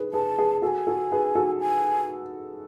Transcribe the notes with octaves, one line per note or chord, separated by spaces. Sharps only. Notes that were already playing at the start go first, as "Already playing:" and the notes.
Already playing: G#4 B4
G#4 B4 A5
G#4 B4
F#4 A4 G#5 A5
F#4 A4
G#4 B4
F#4 A4
G#5